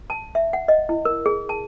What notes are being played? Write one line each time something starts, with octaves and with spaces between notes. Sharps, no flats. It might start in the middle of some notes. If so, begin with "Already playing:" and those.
A5
E5
F#5
D#5
E4
A#4
G#4
A5